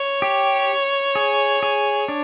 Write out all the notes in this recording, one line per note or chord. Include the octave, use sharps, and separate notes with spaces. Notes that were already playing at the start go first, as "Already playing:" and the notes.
Already playing: C#5
G4
G#4
G#4
D4